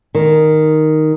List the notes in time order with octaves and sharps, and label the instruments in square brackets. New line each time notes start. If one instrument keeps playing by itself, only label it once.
[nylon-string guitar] D#3